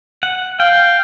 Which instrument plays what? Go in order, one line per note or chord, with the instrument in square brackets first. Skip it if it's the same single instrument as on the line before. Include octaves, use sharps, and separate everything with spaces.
[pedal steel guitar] F#5
[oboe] F5 [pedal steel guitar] G5